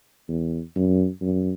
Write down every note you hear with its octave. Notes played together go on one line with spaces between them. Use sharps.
E2
F#2
F#2